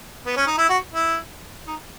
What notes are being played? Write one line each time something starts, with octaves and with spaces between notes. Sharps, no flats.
B3
C#4
D#4
E4
F#4
E4
D#4